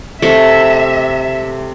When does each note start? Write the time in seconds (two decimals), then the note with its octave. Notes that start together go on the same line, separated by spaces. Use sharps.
0.22 C3 A3 E5